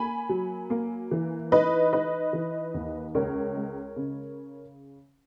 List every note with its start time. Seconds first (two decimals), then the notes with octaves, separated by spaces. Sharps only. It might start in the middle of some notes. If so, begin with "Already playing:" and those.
Already playing: A#3 G#5 B5
0.29 F#3
0.70 A#3
1.11 E3
1.52 D#4 B4 D#5
1.93 D#4 B4 D#5
2.33 E3
2.74 D#2
3.15 C#2 A#4 C#5
3.56 G#3
3.96 C#3